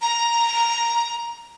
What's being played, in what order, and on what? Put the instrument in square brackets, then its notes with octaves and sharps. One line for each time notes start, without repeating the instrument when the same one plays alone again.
[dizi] A#5